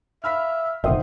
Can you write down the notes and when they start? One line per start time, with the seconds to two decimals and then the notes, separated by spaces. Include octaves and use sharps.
0.24 E5 F5 B5 F6 B6
0.84 F1 A#1 D3 D#3 C5 E5 G5 D#6